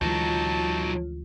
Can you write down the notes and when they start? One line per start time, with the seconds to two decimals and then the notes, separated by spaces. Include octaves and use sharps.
0.01 D2 E3 F#3 G#3 D#4 F4 A5